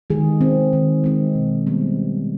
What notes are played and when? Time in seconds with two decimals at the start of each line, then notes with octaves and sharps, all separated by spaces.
0.10 D#3 G#3 G#4
0.41 G#3 C4
0.73 D#3
1.04 G#3 C4
1.35 B2
1.67 G3 B3